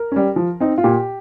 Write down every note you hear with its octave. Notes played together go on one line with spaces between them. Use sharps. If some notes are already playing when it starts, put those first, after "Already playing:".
Already playing: A#4
G3 C#4
F3
C4 D#4
F4
A#2 G4